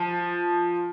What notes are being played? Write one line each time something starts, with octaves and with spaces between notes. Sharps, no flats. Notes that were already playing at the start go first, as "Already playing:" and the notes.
Already playing: F3